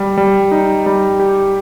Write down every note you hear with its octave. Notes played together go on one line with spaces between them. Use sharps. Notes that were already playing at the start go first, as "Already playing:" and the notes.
Already playing: G3
G3
D#4
G3
G4